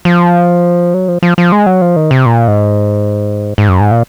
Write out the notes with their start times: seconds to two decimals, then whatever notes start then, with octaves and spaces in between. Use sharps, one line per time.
0.05 F3
0.94 F#3
1.08 F3
1.23 F3
1.38 F3
1.52 G#3
1.66 F#3
1.82 F3
1.96 D#3
2.11 C3
2.26 A#2
2.48 G#2
3.58 G#2
3.69 F#2
3.80 G#2
3.91 A#2